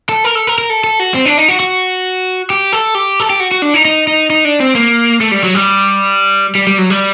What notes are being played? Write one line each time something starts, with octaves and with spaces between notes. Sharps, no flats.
A4
A#4
A4
A#4
A#4
A4
A4
F#4
C4
D4
D#4
F#4
F#4
G4
A4
G4
A4
G4
F#4
F#4
D4
D#4
D#4
D#4
D#4
D4
C4
A#3
A3
G3
F#3
G3
G3
G3
F#3
G3